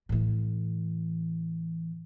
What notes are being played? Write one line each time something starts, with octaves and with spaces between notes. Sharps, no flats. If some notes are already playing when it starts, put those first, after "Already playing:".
A2 E3